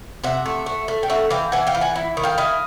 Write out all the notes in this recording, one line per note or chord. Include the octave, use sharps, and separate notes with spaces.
C3 E5 F#5
A3
A3
A3
G5
C#4 E5 F#5
E3 F5 G5
E3 F#5 G#5
F5 G5
E3
F#5 G#5
E4
D#3
F5 G5
E4 D#5 F5